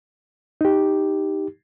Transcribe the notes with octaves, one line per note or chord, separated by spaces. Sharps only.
D#4 G4